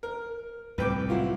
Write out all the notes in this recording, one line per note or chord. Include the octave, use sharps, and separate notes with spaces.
A#4
C2 A2 C3 B4 G5 D6
F#3 E4 F4